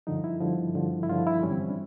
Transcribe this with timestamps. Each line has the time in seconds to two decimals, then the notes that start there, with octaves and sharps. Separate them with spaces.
0.07 G2 D3 F3 D#4
0.24 E4
0.41 G2 D3 F3
0.75 G2 D3 F3
1.03 E4
1.09 G2 D3 F3 F4
1.27 E4
1.43 G#2 E3 G3 C#4
1.51 C4
1.60 C#4
1.69 D4